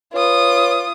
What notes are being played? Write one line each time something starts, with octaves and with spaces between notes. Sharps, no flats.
F4 B4 C#5 D#6